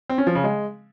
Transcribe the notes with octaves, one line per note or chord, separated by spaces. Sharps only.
C4
C#4
F3
C#3
G#3